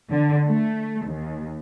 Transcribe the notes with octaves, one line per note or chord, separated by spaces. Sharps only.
D3
A3
D#2